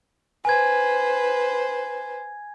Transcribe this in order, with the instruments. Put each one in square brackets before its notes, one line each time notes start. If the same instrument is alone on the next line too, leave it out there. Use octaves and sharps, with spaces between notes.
[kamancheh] B4 C5 [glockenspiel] G#5 G#6